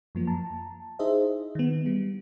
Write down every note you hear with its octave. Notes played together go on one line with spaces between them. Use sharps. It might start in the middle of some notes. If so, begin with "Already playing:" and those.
F#2 F3 A#3
A5 A#5
D#4 E4 G#4 C5 D#5 E5
D#3 B3
G3